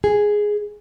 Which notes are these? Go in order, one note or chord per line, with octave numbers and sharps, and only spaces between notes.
G#4